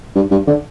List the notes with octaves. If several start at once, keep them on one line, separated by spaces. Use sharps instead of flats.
G2
G2
D3